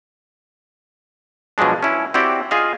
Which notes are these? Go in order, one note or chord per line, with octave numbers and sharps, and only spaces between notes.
B2 F3 F#3 G#3 D4
C#4 E4
C4 E4 F#4 G4 D5
F4 G#4 D#5 F5